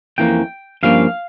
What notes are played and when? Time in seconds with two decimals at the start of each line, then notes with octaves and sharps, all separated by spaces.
0.18 F2 E3 A#3 C#4 G5
0.83 G2 F3 A#3 C#4 F5